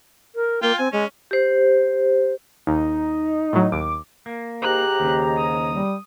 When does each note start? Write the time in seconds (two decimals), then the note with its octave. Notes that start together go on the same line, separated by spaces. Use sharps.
0.35 A#4
0.63 A#3 F4 G5
0.78 C4 G#5
0.93 G#3 C#4
1.31 G4 C5
2.67 D#2 D#4
3.53 A2 F#3
3.72 D#2 D6
4.26 A#3
4.62 G#2 G4 A#5 F#6
5.00 D#2 C#3
5.37 D#6
5.71 G3